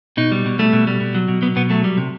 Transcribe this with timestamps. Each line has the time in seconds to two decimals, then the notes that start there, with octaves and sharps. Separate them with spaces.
0.17 B2 D#4
0.32 G3
0.46 B2
0.59 G3 A3
0.73 B2
0.87 G3
1.00 B2
1.15 F#3
1.28 B2
1.42 F#3 B3
1.56 B2 B3
1.70 F#3 A3
1.84 G3
1.97 C3